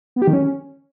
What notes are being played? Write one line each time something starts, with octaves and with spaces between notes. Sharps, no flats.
B3
G4
D#3
C#4